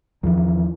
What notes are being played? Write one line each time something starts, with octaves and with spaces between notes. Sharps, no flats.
E2 D#3 F3